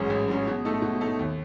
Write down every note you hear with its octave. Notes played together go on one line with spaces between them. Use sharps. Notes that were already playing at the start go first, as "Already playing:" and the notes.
Already playing: A1 G#2 F#3 C#4 G#4
A1
G#2 F#3 C#4 G#4
B2
A3 D#4 A4
B2
A3 D#4 A4
D#2